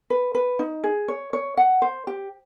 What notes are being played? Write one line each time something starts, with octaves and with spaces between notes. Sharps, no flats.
B4
B4
D#4
G#4
C#5
C#5
F#5
C5
G4